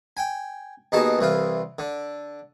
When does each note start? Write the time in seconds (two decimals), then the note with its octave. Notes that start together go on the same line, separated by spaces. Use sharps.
0.17 G5 G#5
0.92 D#2 B2 D#4 G#4 A5
1.19 C2 E3 F4
1.79 D3